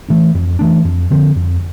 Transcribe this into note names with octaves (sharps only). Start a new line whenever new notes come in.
E3 A3 D4
F2
E3 A3 D4
F2
D3 F3 C4
F2